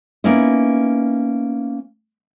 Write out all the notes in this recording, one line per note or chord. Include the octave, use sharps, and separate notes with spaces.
A#3 B3 C#4 D#4 E4